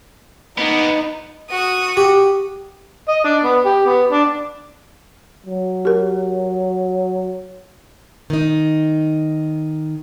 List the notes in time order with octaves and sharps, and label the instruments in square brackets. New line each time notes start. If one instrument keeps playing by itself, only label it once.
[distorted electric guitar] A#3 B3 [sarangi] D#4
[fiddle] F#4 D#6
[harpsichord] G4
[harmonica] D#5
D4
B3
G4
B3
D4
[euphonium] F#3
[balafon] G4 A#4
[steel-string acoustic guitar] D#3 D#4